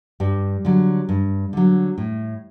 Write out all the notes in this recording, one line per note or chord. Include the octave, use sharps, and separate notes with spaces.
G2 G3
D3 F#3
G2
D3 F#3
A2